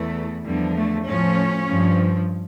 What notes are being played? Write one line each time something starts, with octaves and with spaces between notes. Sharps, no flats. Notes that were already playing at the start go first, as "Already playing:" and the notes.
Already playing: E2 E3 A3
E2 D3 F3 G3
A3
A2 F3 C#4
G2 F3